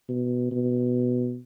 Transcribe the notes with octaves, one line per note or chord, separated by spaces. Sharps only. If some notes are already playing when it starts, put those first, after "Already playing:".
B2
B2